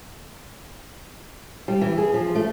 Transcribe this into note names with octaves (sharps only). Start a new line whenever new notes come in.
G3
E3
G#4
F3
A3